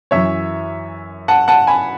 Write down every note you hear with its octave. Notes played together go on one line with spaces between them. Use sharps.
F#2 E3 C#5 E5
F#5 A5
F#5 A5
G#5 B5